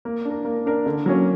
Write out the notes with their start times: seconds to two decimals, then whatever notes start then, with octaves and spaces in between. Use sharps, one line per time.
0.05 A#3
0.25 D4 A#4
0.45 A#3
0.66 D4 A#4
0.86 D3
1.06 F#3 A#3 C#4